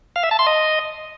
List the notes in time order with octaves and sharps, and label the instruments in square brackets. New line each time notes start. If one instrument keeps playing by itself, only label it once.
[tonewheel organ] F5
E5
A5
C6
D#5